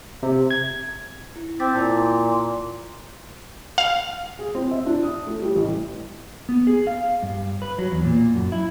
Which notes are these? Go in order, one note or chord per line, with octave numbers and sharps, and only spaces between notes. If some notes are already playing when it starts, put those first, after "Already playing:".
C3
G#6
E4
C4 D6 A6 B6
A#2 E4 A5
F5
G#4
C4
E5
D4
D#6
A3
G3
A1
B3
G#4
F5
G2
B4
F#3
E2
A#2
F#2
E4